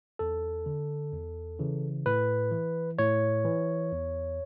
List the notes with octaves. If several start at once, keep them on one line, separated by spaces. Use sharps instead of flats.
E2 A4
D3
E2
C#3 E3
A2 B4
E3
A2 C#5
E3
E2